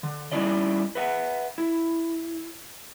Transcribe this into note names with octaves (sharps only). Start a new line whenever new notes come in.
D3
G3 C#4 D#4 E4 D5 D#5
B4 E5 F#5
E4